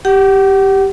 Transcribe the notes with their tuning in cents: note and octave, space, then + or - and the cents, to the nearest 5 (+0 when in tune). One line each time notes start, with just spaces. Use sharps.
G4 +0 F#5 +35